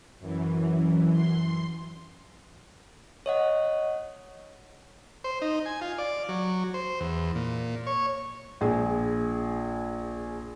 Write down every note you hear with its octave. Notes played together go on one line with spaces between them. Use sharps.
F#2 E3
C6
C#5 D#5 F#5
C5
D#4
G#5
F4
D5
F#3
C5
E2
A#2
C#5
A#1 G#4